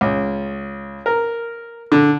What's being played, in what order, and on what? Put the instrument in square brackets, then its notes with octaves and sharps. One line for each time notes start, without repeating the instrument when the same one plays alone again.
[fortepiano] C#2
A#4
D3